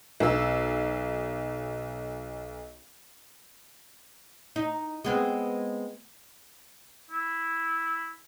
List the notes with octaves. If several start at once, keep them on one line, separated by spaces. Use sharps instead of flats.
B1 E6
D#4
G#3 B3 C4
E4